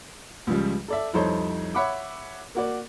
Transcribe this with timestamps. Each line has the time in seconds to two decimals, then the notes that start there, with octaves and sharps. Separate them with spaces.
0.47 C#2 C#3 F3 G3
0.88 A4 D5 E5
1.13 C2 F2 D#4 A4 C5 C#5
1.74 C#5 E5 F#5 B5 D6
2.55 A#3 F#4 D5